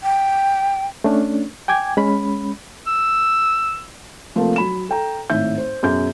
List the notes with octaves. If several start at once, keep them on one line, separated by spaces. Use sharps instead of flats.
G5
A3 C#4 D4
G5 G#5 D6 G#6
G#3 C#4 B5
E6
C3 F3 A3 A#3 F4 A#4
F#3 B5 E7
A4 G5 A#5
G#1 A2 E5 G6
C5
F#2 B2 G#4 G6